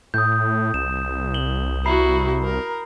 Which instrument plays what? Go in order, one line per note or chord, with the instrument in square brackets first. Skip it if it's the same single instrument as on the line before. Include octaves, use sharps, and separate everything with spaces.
[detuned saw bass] A2 [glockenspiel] D#6 G6
[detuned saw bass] C2 [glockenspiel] E7
[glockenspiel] F#7 G7
[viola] E4 F#4 [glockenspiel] A#5 B5 C7
[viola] A#4